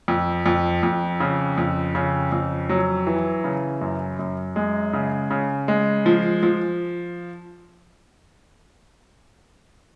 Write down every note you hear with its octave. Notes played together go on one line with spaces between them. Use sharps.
F2
F2
F2
C#3
F2
C#3
F2
F#3
E3
C#3
F#2
F#2
G#3
C#3
C#3
G#3
F3
F3